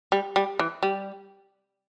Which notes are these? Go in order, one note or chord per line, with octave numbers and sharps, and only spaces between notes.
G3
G3
E3
G3